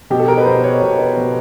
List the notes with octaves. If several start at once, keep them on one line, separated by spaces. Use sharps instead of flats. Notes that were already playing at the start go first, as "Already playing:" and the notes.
B2 G4
A4
A#4
B4
B2 C5
C#5
B2
B4
B2